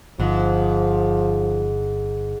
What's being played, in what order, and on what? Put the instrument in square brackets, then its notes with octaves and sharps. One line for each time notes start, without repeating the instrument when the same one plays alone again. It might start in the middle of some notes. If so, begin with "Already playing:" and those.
[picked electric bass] G1 [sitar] G#2 [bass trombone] F3